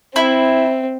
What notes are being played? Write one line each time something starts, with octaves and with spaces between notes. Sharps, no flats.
C4 E4